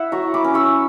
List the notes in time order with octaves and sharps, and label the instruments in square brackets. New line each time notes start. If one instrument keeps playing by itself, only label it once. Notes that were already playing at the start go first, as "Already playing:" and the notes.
Already playing: [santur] E4 E5 F#5
F#3 A#5 C#6
B5 D6
C#4
C#6 E6